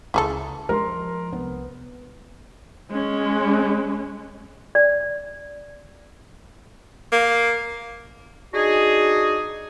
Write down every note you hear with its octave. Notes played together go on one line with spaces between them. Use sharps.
C#2 C#3 E4 G#4 A4
F3 G#3 A#4 C6
C2 B3
G#3 C#4
D5
A#3
D4 D#4 F#4 G#4